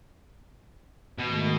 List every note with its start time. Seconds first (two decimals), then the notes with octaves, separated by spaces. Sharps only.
1.19 G#2 B2 D#3 A3